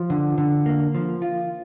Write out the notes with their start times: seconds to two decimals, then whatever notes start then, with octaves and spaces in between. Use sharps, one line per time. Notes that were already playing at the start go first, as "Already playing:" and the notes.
Already playing: F3
0.10 D3
0.38 D3
0.66 A#3
0.95 F3
1.22 F4